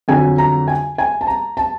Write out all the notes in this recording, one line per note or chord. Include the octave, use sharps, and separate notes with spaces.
F2 D3 F#3 G#5
A#5
G#5
G#5
A5
A#5
A5